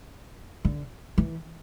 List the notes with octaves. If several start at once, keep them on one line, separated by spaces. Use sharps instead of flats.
D3
E3